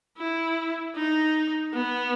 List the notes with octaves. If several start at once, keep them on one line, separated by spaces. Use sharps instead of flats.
E4
D#4
B3